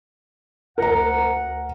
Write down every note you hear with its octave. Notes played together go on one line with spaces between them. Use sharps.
D2 A#4 F#5 A#5